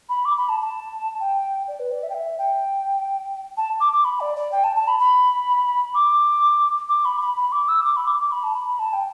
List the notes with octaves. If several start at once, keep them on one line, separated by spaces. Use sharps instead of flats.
B5
D6
B5
A5
A5
G5
D5
B4
D5
E5
G5
E5
G5
A5
D6
D6
B5
D5
D5
G5
A5
A5
B5
B5
D6
D6
B5
B5
B5
D6
E6
D6
B5
D6
D6
B5
A5
B5
A5
G5